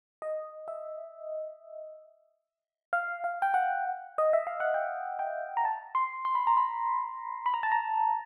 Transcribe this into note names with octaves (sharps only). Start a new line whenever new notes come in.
D#5
E5
F5
F5
G5
F#5
D#5
E5
F5
F#5
G5
G5
A#5
A5
C6
C6
B5
A#5
B5
B5
A#5
A5
A#5